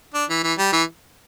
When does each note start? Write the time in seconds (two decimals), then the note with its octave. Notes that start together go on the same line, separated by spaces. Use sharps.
0.14 D4
0.29 E3
0.43 E3
0.58 G3
0.72 E3